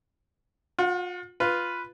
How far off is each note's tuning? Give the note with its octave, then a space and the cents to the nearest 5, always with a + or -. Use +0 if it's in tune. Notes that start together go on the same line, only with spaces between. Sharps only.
F4 +40 F#5 +0
F4 +0 B4 +0